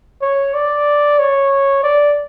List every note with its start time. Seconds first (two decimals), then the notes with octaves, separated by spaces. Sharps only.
0.22 C#5
0.54 D5
1.19 C#5
1.84 D5